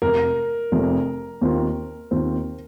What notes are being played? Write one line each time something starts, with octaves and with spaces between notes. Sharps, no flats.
F1 F2 C3 A#4
F1 F2 C3
D#2 D#3 C4 F4
D#2 D#3 C4 F4